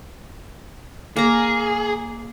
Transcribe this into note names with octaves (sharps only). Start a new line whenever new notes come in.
A#3 G#4 A#5